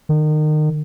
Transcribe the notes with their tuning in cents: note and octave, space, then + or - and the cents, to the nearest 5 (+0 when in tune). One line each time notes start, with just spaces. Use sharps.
D#3 -30